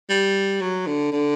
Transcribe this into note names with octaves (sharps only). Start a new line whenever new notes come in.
G3
F#3
D3
D3